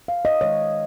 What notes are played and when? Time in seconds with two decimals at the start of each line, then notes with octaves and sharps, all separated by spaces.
0.08 F5
0.25 D#5
0.41 D#3 G#3 C#5